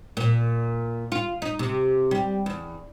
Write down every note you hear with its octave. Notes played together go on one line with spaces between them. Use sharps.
A#2
F4
D#4
C3
G3
E2